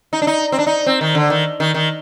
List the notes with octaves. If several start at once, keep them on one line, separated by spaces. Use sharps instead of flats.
D#4
D4
D#4
C4
D4
D#4
C4
D#3
D3
D#3
D#3
D#3